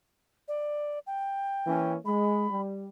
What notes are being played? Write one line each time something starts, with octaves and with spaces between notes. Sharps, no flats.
D5
G5
E3 A#3 C#4
G#3 B5
G3